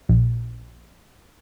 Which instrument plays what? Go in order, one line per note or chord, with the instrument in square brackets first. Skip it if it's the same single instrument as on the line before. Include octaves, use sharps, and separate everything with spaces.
[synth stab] A#1